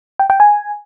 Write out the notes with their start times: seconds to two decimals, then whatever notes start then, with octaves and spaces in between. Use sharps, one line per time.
0.19 G5
0.30 G5
0.40 G#5